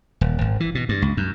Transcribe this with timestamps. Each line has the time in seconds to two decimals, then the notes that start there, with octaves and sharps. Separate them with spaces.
0.21 D#1
0.41 G#1
0.60 E3
0.75 B2
0.89 G2
1.02 C#2
1.17 F#2